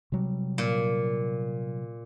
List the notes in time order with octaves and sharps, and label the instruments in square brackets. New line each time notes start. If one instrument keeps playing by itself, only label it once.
[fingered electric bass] C3 F#3 G3
[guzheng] A#2